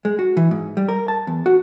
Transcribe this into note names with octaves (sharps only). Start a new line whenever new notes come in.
G#3
F#4
E3
G#2
G3
A#4
A5
E2
F#4